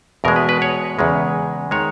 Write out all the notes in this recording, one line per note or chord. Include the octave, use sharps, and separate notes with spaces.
E2 B2 G#3 A#4
B4
B4
C#5
E2 C#3 G#3
D#3 G#3 C#5